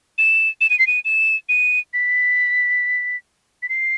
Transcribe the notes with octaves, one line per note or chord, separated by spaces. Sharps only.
E7
E7
D#7
C7
D#7
E7
D#7
B6
B6
C7